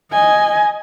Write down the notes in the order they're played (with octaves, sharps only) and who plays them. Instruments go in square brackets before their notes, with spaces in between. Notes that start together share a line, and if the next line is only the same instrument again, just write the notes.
[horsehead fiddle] D#5 G#5